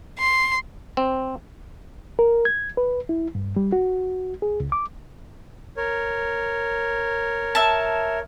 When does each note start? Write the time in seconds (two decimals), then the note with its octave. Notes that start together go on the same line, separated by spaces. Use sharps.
0.19 C6
0.97 C4
2.19 A#4
2.45 G#6
2.77 B4
3.09 E4
3.35 G2
3.56 G3
3.72 F#4
4.42 G#4
4.60 C#2
4.72 D6
5.77 A#4 C#5
7.55 E5 A5